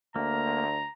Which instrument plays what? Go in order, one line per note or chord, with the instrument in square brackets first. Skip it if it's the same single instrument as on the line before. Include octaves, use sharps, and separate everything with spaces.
[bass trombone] D2 [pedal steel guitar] A#3 [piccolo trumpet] A#5